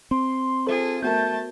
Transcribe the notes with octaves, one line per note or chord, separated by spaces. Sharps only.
C4 C6
F4 G#4 A4 C5
A3 B3 F#4 A#4 A5 G6